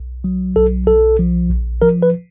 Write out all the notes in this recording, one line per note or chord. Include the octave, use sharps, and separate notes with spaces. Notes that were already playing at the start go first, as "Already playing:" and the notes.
Already playing: B1
F#3
B1 A4
B1 A4
F3
A#1
F3 A#4
B4